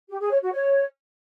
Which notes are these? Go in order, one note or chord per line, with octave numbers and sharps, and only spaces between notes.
G4
G#4
C#5
F#4
C#5